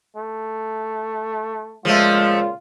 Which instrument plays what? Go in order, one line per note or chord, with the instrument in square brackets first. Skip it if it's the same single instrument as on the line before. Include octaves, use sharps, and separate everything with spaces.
[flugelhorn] A3
[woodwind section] A#2 C#3 G#3 [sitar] F3 A3 [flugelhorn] F4